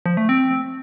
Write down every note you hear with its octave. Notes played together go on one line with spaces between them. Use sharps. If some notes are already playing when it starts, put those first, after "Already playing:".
F3
A3
C4